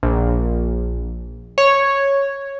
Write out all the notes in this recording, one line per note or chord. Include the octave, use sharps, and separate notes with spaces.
A#1
C#5